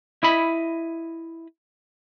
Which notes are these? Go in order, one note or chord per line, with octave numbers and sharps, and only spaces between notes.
E4 D#5 B5